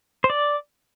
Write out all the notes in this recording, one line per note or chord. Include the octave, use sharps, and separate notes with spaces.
C5
D5